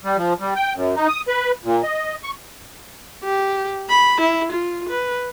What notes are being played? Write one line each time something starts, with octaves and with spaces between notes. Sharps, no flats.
G3
F3
G3
G5
F#2
D#4
D#6
B4
A#2
D#5
C#6
G4
B5
E4
F4
B4